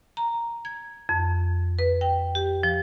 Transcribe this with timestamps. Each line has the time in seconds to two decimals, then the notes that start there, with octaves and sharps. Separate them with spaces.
0.17 A#5
0.65 G#6
1.09 F2
1.79 B4
2.01 G5
2.35 G4
2.63 F3